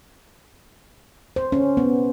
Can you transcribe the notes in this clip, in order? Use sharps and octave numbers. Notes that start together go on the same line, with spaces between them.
C5
C#4
B3